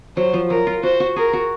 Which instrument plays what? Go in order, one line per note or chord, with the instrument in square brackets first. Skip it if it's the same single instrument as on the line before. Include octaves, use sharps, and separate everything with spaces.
[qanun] F#3 [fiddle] C5
[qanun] F3
[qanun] F#3 [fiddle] A#4
[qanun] F4
[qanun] F#4 [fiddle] C5
[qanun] F#4
[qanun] G#4 [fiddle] A#4
[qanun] F#4